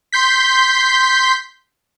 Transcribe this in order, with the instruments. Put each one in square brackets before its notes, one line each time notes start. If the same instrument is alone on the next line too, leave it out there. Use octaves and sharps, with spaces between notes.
[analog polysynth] C6 G6 B6